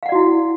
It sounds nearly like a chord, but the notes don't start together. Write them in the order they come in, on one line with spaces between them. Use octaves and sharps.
F5 F#5 D5 F#4 E4